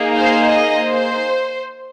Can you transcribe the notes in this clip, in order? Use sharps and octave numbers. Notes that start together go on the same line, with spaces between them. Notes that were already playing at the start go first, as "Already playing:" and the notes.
Already playing: A#3 D#4 G#4
C5 F5
D#5
C5